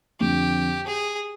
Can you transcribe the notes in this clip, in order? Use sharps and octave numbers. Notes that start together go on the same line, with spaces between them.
F2 D3 F3 G4
G#4